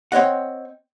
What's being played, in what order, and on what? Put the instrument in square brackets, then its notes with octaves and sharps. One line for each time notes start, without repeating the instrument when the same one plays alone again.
[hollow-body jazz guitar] C4 C#5 D#5 F#5